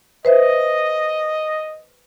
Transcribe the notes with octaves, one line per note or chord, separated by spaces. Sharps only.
B4 C5 D#5 E5